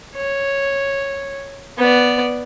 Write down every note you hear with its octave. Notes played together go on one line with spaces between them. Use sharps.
C#5
B3 D5